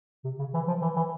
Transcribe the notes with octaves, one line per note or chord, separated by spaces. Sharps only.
C3
C#3
E3
F3
E3
E3